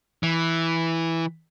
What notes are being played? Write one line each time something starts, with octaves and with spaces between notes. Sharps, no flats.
E3